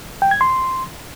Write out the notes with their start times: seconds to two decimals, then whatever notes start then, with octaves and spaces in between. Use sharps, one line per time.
0.22 G5
0.31 G#6
0.41 C6